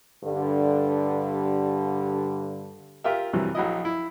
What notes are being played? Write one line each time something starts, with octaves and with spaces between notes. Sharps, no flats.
G2 D3
F4 G4 A#4 E5
G2 C3 E3 F#3
A#1 F#3 E4 D#5
E4